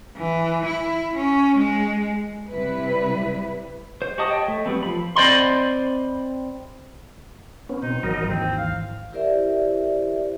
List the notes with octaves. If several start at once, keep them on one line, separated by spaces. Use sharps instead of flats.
E3
E4
C#4
G#3
C3 G3 E4 B4
C5
F#4 G4 D#5 A5 D#6
C#5 D#5 G5 A5
A3
F#3 G3 B3 C4
F3 B5
C4 C5 D5 D#5 B5 C6
B3 C#4
B2 C4 D#4
G#1 E3 F#3 A#4 D#5
D#2 C4
F5
E4 G4 A#4 C5 D5 E5